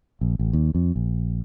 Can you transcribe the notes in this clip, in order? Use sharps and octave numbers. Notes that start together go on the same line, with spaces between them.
A#1
A1
D#2
F2
A#1